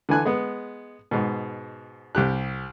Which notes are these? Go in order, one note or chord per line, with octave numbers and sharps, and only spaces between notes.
D3 E3 G#5 F#6
G#3 B3
G#2 B2
C2 G4 F#6